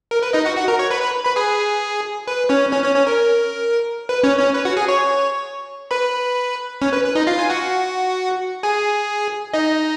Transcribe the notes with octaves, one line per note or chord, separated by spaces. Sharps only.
A#4
B4
D#4 D#5
F#4 F#5
F#4 F#5
A#4 A#5
C#5 C#6
B4 B5
B4 B5
B4 B5
G#4 G#5
B4
C#4 C#5
C#4 C#5
C#4 C#5
C#4 C#5
A#4
B4
C#4 C#5
C#4 C#5
B4
F#4 F#5
G#4 G#5
C#5 C#6
B4 B5
C#4 C#5
B4
B4
D#4 D#5
F4 F5
G#5
F#4 F#5
G#4 G#5
D#4 D#5